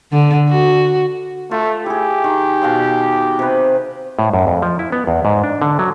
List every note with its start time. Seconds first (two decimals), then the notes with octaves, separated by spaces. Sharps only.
0.12 D3
0.49 F#4
1.51 A3 F4
1.86 E4 G4 G#4
2.24 D#3
2.62 B2 F5 C6
3.39 C3 B4
4.19 A2
4.34 F#2
4.47 F2
4.62 F3
4.79 E4
4.92 B3
5.07 E2
5.25 G#2
5.44 D4
5.62 D3
5.79 F#3